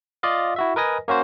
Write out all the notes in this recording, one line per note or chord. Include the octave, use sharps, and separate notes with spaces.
F4 D5 D#5 F5
E4 F#4 E5
A#4 B4 D#5 G#5 A#6
A#3 C#4 F#4 C5